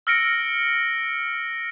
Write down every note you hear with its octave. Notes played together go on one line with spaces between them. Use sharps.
E6 F6 A#6 C#7 D7